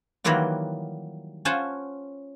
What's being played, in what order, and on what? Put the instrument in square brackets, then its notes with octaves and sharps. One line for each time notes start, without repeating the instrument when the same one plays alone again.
[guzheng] D#3 E3 F#3 G3 A#3 F4
C#4 F4 C5 F#5 G#5 A5